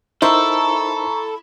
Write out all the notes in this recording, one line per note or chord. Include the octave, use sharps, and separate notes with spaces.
D#4 E4 A4 A#4 C5 A#5 C#6